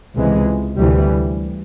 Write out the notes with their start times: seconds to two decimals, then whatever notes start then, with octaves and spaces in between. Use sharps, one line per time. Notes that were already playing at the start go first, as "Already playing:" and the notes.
0.15 C#2 C3 E3 G#3
0.79 D2 C3 E3 G3